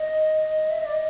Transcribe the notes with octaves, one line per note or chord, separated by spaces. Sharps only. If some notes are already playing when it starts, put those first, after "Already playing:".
Already playing: D#5
E5
D#5
D5
D#5